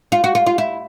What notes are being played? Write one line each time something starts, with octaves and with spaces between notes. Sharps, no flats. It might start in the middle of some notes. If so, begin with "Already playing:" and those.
F4
F#4
F4
F4
E4